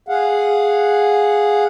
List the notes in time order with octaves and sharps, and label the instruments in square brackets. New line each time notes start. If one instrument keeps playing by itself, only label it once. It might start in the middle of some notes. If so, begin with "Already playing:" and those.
[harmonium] G#4 F5 F#5